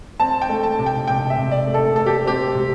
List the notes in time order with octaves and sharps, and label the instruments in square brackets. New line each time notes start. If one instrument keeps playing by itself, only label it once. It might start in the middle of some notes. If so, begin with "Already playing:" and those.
[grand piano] C4 A5
G5
A3
A5
C3
G5
C3 G5
E5
C3
D5
A3
A4
A3 A4
G4
C4 G4
C3